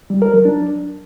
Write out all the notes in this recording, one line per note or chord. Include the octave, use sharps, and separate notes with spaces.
G3
A#4
F#3
D4